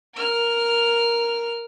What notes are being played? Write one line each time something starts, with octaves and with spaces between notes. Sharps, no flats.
A#4 F6